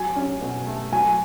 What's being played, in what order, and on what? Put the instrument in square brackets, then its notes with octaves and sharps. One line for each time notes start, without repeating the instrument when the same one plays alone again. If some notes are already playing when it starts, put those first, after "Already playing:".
Already playing: [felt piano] F#3 [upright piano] G#5
[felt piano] C#4
B2
A3
[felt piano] F#3 [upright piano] G#5